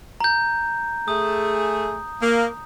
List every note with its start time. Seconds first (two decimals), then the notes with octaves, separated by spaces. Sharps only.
0.20 A#5 G6
1.08 A3 G#4 D#6
2.22 A#3